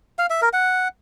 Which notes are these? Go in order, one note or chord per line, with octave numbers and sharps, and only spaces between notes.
F5
E5
A#4
F#5